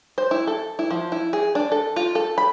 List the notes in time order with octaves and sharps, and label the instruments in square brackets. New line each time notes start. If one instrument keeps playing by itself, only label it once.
[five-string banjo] C5
E4
A4
E4
F3
E4
G#4
D4
A4
F4
A4
B5